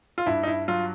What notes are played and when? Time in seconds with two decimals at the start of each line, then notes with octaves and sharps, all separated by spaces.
0.18 F4
0.26 G2 E4
0.43 D#4
0.47 E4
0.68 F#3 F4